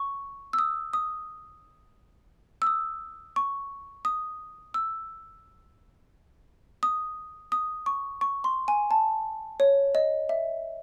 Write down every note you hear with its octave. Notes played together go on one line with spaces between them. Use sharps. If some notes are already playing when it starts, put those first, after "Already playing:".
Already playing: C#6
E6
D#6
D#6
E6
D#6
C#6
D#6
E6
D#6
D#6
C#6
C#6
C6
G#5
A5
C#5
D#5
E5